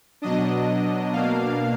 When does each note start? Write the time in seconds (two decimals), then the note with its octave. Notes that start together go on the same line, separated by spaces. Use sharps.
0.22 B2 F#3 D4 D#5
1.13 B2 A#3 D4 F5